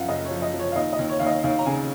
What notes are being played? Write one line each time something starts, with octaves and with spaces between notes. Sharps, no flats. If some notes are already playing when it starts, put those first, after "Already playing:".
Already playing: F#2 F3 F5 F#5
F#1 D#5
C#5
F3
D#5
F3
C#5
F5
D#2 D#5
D#5
D#2
C#5
D#2 F5
D#5
D#2 F5
A#5
C#3 G#5